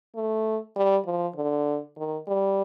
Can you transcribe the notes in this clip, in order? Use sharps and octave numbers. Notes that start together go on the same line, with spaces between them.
A3
G3
F3
D3
D#3
G3